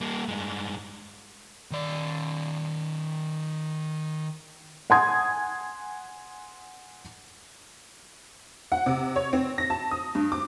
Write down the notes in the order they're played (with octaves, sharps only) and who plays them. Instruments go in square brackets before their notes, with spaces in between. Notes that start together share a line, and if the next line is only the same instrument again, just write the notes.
[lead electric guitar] G3 A#3
G2 G#3
D#3 D5
[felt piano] F#5 G#5 C6 D#6 G#6
[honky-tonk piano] F#5
C3
C#5
C4
A#6
A5
D#6
G2
D6